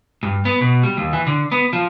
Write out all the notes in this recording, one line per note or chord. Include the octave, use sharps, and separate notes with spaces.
G2
B3
B2
G3
D#2
E3
D3
B3
F3